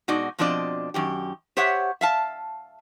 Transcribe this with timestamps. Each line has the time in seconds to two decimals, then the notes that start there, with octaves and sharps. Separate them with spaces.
0.08 B2 G#3 D#4 F#4 D5
0.39 B2 F3 C4 D4 D5 D#5
0.94 F#2 D#3 G4
1.57 G4 C5 C#5 E5 F#5
2.01 E5 F5 A5